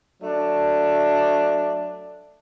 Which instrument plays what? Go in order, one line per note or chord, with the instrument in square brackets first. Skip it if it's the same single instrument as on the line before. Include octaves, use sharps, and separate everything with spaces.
[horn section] F#3 A3 D4